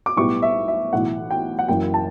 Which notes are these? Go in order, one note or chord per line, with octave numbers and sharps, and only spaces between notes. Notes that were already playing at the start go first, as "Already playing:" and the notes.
D6
B1 A2 G3 B3 E4 C#6
E5
E5
B1 A2 E3 F#5
G5
F#5
F#1 F#2 E3 G5
A5